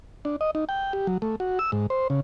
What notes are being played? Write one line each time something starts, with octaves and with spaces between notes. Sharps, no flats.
D4
D#5
D#4
G5
G4
F#3
A3
F#4
E6
G#2
C5
C#3